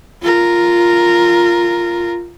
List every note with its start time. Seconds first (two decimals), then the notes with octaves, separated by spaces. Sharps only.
0.22 F4 A#4